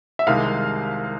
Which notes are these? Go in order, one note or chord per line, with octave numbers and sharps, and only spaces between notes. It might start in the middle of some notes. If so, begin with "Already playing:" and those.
E5
C2 C3 D#3 G#3 F5